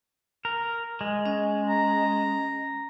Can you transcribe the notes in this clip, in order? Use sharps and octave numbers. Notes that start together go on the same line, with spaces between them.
A#4
G#3
C#4
A#5